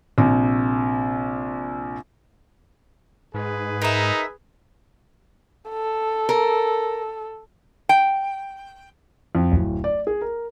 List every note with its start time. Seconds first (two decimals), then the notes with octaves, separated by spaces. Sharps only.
0.18 A#1 C3
3.34 G#2 G#4 B4
3.82 D#4 A#4 E5
5.70 A4
6.29 A#4
7.89 G5
9.35 F2
9.52 D1
9.84 D5
10.07 G#4
10.22 A#4